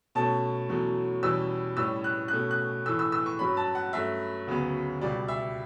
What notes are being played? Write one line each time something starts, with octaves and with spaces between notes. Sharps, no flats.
B2 A3 C#4 A5
E2 B2 F#3 A3 C#4
E2 B2 G3 C#4 E6
A2 G3 C#4 E6
F#6
B2 A3 C#4 F#6
F#6
A2 E3 A3 E6
E6
E6
C#6
G2 F#3 C#4 B5
A5
F#5
G2 F#3 A3 C#4 E5
D2 C#3 F#3 B3
C#2 B2 G3 D5
E5